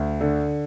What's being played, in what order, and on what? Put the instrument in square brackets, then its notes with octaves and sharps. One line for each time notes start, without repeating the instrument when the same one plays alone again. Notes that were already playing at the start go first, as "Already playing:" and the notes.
Already playing: [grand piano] D2
D3